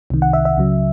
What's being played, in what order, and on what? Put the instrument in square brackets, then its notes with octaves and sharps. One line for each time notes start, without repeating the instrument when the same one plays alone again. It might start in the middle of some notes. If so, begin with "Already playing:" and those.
[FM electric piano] C2 C3 D#3
F#5
E5
E5
C#2 C#3 F#3